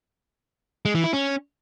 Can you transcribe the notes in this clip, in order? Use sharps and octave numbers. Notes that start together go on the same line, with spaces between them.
G#3
E3
E4
C#4